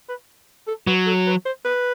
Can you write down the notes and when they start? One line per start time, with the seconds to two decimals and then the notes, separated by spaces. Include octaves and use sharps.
0.09 B4
0.67 A4
0.87 F#3 B4
1.06 A4
1.27 B4
1.46 C5
1.65 B4